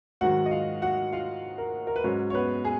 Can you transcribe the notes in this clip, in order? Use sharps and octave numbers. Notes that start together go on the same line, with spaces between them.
G#2 D#3 F#3 F#4 F#5
D#5
F4 F5
F#4 F#5
F4 F5
A#4
A#4
B4
G#2 F#3 C#4 C#5
C#5
B3 B4
G#4